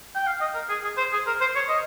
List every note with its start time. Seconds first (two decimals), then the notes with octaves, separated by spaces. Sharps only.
0.15 G5
0.26 F5
0.41 D#5
0.54 A#4
0.69 G#4
0.83 G#4
0.97 C5
1.13 G#4
1.27 A#4
1.41 C5
1.55 C#5
1.69 D#5